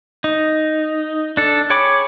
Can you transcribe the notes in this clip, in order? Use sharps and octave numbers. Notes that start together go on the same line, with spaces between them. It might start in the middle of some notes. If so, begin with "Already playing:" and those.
D#4
D4 A4
G#4 C#5 G5 B5 D6